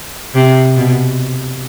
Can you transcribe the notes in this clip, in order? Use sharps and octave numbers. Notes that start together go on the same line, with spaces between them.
C3
B2